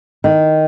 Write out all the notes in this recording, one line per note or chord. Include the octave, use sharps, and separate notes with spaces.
D#3